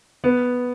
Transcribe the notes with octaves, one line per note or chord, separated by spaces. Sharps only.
B3